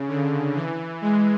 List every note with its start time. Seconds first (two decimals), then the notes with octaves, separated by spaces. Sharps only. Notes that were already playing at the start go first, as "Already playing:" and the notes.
Already playing: C#3
0.08 D3
0.55 E3
1.01 G#3